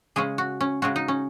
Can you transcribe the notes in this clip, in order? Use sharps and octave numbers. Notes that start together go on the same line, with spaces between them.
C#3 G#3 C#4 G#4
F#4
C#4
C#3 G#3 C#4 F#4
D#4
C#4